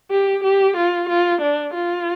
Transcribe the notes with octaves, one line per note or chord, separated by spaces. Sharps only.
G4
G4
F4
F4
D4
F4